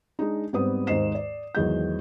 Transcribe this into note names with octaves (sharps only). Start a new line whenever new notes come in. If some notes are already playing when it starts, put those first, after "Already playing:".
G#3 D4 D#4
G#2 G3 B3 C4 B4 D#6
D#2 G#2 C5 D#5 C7 E7
D5
G#1 E2 F#3 G#3 D#5 G6